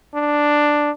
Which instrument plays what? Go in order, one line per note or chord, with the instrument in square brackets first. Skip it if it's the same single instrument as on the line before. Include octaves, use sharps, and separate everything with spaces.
[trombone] D4